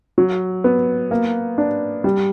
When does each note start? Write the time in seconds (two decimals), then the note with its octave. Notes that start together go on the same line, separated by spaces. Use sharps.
0.18 F#3
0.64 B3
1.11 A#3
1.58 D4
2.04 G3